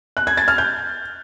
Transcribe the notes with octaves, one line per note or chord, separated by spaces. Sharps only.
F#6
G#6
A6
F6
G6